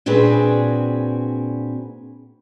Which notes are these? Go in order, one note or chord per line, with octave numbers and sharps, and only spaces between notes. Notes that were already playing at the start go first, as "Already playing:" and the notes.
A#2 C4 D4 F#4 G#4 B4